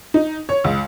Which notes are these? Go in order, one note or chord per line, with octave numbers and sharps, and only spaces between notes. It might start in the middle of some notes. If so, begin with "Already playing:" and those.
D#4
C#5
C#2